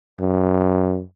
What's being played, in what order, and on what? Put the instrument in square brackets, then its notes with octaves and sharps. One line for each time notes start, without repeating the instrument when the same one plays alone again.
[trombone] F#2